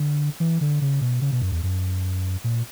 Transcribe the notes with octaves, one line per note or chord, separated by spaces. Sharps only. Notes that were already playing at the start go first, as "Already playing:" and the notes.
Already playing: D3
E3
D3
C#3
B2
C#3
B2
F#2
E2
F#2
A#2